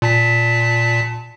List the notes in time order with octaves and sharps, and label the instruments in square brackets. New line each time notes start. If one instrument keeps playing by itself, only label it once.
[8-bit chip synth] A#2 A5 B6